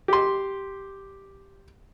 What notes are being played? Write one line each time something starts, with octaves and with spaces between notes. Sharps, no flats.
G4 C6